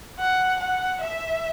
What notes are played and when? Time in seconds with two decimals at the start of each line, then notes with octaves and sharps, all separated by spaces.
0.19 F#5
0.60 F#5
1.01 E5